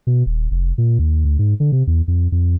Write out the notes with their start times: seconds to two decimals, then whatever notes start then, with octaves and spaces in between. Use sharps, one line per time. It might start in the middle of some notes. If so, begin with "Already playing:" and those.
0.07 B2
0.26 D#1
0.51 F1
0.78 A#2
0.99 D#2
1.25 D2
1.39 G#2
1.60 D3
1.72 C3
1.87 E2
2.08 F2
2.32 F2